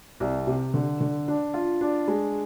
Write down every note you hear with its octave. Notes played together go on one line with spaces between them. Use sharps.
C2
C3
D3
D3
D4
F4
D4
G#3